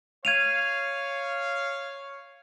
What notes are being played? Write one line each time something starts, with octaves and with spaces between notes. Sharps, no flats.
C#5 F5 G#6 D#7 F7